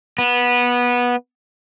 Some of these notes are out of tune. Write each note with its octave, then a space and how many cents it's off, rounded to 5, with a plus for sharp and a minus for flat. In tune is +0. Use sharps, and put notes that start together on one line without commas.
B3 -15